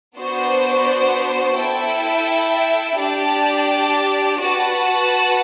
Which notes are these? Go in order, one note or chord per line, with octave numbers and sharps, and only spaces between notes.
B3 D4 F#4 C5
E4 A4 E5 G5
D4 G4 D5 A5
F#4 B4 F#5 A5